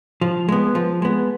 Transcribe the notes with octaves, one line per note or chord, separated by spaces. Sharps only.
F3
G#3 B3
F3
G#3 B3